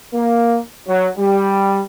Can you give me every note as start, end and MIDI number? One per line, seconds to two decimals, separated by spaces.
0.14 0.58 58
0.87 1.08 54
1.17 1.80 55